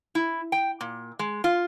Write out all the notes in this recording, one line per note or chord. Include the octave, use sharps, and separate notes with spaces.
E4
G5
A#2
G#3
F4